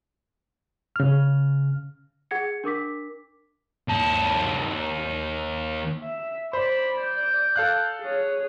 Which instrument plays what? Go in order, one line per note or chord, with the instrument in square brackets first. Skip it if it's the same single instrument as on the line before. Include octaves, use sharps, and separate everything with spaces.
[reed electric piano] C#3 F6
[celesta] G#4 F#5 G#6 C#7
D4 A#4 D6 B6
[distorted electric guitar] D#2 A5
[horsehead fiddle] E5
[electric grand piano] C5 [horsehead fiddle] D5 [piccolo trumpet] B5
[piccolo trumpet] G6
[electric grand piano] A4 F5 F#6
[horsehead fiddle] G#4 C#5